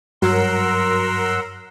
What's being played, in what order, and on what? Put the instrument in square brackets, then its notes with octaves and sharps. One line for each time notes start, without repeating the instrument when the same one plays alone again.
[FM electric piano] G2 [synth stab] F#3 [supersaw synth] A#4 [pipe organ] F#5 C6 E6